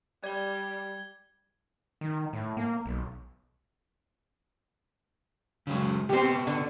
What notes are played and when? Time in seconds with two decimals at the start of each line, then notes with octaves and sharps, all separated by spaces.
0.24 G3 D5 G#6 G7
2.01 D#3
2.33 A2
2.57 A#3
2.86 B1
5.67 C#3 F#3 G#3
6.09 C3 B3 C4 G4
6.47 D3